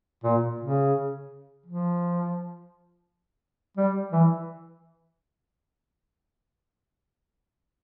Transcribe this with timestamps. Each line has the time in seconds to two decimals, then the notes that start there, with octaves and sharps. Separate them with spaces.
0.24 A#2
0.60 C#3
1.66 F3
3.77 G3
4.12 E3